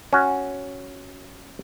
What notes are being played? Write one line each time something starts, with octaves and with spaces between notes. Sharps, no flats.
C#4 F#4